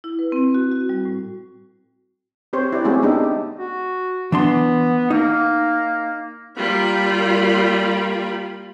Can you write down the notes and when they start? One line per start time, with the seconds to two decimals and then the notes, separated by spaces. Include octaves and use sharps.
0.04 E4
0.19 B4
0.32 C4
0.54 F#4
0.72 F#4
0.89 G3
1.05 A2
2.53 C4 G4 C5 C#5
2.72 E4 G4 D5
2.84 G#3 A3 C4 C#4 F#4 G#4
3.02 G#3 B3 D4 D#4 G4 E5
3.24 D#4
3.59 F#4
4.32 E3 B3 D4 C6
5.10 A#3 D#4
6.56 G3 A#3 F4 A#4 B5